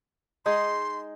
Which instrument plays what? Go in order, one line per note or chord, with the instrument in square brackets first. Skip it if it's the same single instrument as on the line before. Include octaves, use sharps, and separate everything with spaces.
[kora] G#3 D#4 G#4 [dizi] C6